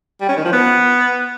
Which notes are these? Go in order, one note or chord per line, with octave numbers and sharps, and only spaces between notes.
G3
C#4
D#3
F3
B3